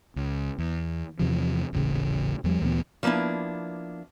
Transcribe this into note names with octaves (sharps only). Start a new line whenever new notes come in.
C#2
E2
E2 C3 F3
D#1 A1 C#3
E2 F3 G3
D2 A#2 E3 B3
F3 A#3 B3 D4 E4